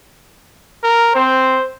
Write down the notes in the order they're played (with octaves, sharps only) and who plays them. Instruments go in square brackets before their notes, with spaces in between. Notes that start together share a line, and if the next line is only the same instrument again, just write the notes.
[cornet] A#4
[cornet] C4 [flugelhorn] C5